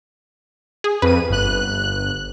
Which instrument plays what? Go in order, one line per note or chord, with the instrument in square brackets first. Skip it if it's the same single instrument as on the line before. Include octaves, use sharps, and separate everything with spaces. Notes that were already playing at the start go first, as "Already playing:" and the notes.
[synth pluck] G#4
[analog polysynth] F2 D#7 [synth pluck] B4
[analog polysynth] G1 F#6